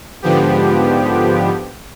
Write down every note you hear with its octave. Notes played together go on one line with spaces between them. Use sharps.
G#2 D3 F3 B3 G4